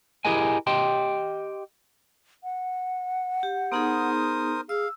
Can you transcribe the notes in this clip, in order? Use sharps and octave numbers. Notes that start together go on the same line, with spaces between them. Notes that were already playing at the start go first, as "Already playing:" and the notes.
E4 G4 G#4 A#4 D#5 G#5
G4 D#5 G5 C6
F#5
G4
B3 D#4 G#4 A#4 C5 D#6
G#4 F5 E6